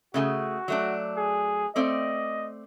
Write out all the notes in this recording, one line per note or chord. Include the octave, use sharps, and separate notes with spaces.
C#3 A3 F#4 G#4
F#3 A3 D4
G#4
A3 C4 D5 D#5